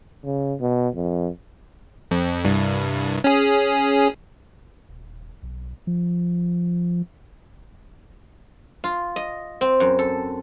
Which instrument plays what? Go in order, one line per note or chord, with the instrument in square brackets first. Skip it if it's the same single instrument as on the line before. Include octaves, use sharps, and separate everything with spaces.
[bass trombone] C#3
B2
F2
[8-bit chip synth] F2
C2 G2
C#4 G#4
[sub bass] D#1
B1
F3
[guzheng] F4
D#5
C4
F#2
A4